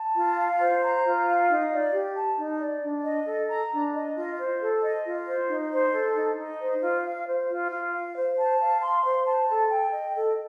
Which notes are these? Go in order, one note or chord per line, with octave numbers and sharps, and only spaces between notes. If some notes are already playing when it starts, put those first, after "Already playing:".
Already playing: A5
F4
F5
C5
A#5
F4
F5
D#4
D5
G4
A5
D#4
D5
D4
D#5
A4
A#5
D4
D#5
F4
C5
A4
D#5
F4
C5
D#4
C5
A4
D#4
D#4
C5
F4
F5
C5
F4
F4
F5
C5
A5
F5
C6
C5
A5
A4
G5
D#5
A4